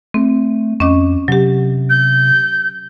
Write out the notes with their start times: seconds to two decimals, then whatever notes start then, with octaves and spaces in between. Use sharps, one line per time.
0.14 A3 C4
0.80 F2 C#4 D#5 D6
1.28 C3 F#3 G4
1.89 G6